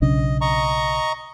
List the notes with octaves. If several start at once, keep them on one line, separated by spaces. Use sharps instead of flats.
B1 C#3 D4 D#5
D#5 A#5 C#6